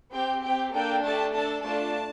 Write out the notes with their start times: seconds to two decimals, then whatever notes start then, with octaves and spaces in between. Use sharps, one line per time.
0.14 C4 G4 G5
0.44 C4 G4 G5
0.74 A#3 D4 A4 G5
1.05 A3 D4 G4 A5
1.35 D4 A4 A5
1.64 A3 D4 F4 A5